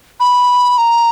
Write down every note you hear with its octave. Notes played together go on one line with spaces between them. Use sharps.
B5
A#5